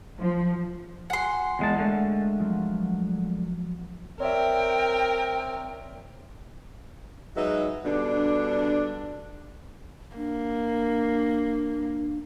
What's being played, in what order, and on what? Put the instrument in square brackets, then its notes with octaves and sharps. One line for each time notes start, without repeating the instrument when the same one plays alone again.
[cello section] F3
[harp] F#4 G#5 [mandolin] F#5 C6
[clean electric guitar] E2 G#3 A5 [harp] A#3 F4
[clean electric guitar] D3 G#3 A3
[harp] F3 F#3 C4
[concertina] C4 [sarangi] A#4 [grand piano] C#5 D5 E5 [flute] G5
[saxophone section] F#3 G#3 D#4 B4 E5
B2 D3 G3 D4
[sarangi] A#3 [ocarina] D4